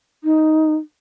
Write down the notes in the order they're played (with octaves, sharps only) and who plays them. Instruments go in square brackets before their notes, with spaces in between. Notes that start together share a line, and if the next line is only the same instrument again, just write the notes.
[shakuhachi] D#4